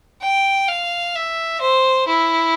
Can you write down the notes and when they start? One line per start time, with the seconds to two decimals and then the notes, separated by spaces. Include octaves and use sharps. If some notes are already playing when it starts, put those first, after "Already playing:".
0.22 G5
0.68 F5
1.16 E5
1.61 C5
2.08 E4